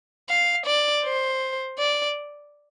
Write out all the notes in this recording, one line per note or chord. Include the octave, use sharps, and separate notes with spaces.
F5
D5
C5
D5